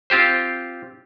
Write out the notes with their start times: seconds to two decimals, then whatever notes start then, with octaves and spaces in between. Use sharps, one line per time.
0.10 C4 F4 G4 C5